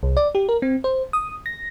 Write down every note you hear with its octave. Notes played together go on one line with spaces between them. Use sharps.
C2
D5
G4
A#4
C4
C5
D#6
A#6